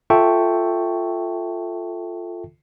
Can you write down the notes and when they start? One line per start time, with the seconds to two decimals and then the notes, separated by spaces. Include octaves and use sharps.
0.10 F4 A4 E5 G5 A5 C#6